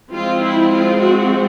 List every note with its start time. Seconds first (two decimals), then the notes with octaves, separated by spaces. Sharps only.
0.12 F3 G#3 C4 F4
0.41 E4
0.71 F4
1.00 F#4